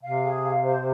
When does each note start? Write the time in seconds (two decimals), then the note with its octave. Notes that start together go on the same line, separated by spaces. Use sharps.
0.02 C3 F5
0.22 G#4
0.44 F5
0.64 C5